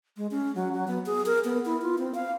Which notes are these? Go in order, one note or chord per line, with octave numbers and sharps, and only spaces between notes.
G#3
C#4
F#3
F#3
B3
G#4
A#4
B3
E4
F4
C4
F5